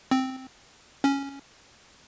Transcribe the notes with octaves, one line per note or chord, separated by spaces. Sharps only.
C4
C#4